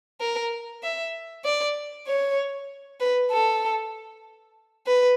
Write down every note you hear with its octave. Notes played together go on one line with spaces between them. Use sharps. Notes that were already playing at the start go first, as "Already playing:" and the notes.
A#4
E5
D5
C#5
B4
A4
B4